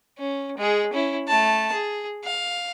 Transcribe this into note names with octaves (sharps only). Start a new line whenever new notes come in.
C#4
G#3 G#4
C#4 E4
A3 A5
G#4
F5